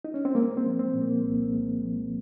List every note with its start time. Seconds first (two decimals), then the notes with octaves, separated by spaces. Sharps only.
0.05 D#4
0.14 C#4
0.25 C4
0.35 G#3 A#3
0.57 C4
0.65 F3
0.79 C4
0.94 A#2
1.02 A#3
1.24 C2
1.53 G#3
1.83 F3